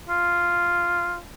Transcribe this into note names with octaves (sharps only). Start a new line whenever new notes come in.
F4